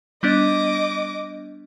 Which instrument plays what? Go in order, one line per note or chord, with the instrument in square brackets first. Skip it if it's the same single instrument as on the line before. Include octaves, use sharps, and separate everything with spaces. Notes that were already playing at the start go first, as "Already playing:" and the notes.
[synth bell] G3 B3 D4 [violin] D#5 D6